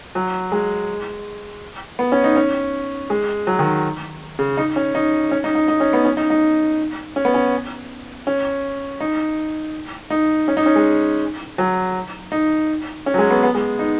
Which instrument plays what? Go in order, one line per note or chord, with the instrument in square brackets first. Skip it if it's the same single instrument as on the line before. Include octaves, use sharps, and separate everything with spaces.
[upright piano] F#3
G#3
B3
C#4
D#4
C#4
G#3
F#3
D#3
C#3
D#4
C#4
D#4
C#4
D#4
D#4
D#4
C#4
B3
C#4
D#4
D#4
C#4
B3
C#4
C#4
D#4
D#4
C#4
D#4
C#4
G#3
F#3
D#4
C#4
F#3
G#3
B3
B3
G#3
D#4